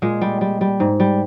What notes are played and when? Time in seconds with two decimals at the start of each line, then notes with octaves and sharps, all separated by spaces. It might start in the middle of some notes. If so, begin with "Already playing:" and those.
0.02 A#2 G#3
0.22 G3
0.41 G3
0.61 G3
0.80 G#2
1.00 G3